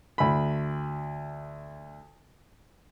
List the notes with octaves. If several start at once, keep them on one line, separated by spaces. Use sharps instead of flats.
D2 B5